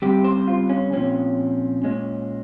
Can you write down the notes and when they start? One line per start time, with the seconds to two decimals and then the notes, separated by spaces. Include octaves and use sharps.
0.02 C#3 G3 C4 G4
0.24 C5
0.48 F4
0.69 C#4
0.93 A#2 F3 C4 C#4
1.83 A#2 G#3 C#4